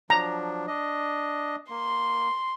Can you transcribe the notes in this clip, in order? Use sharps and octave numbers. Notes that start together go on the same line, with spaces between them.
F3 F#3 D4 A#5
D4 D#5
A#3 C6